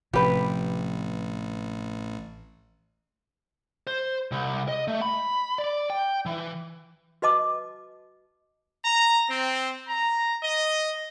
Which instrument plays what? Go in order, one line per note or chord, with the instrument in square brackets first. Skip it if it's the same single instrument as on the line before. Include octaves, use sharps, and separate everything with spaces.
[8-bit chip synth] A1 [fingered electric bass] C3 F3 [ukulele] G4 B4
[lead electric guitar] C5
C2
D#5
A3
B5
D5
G5
E3
[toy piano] F#4 B4 D#5 A5 D6
[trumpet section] A#5
C4
A#5
D#5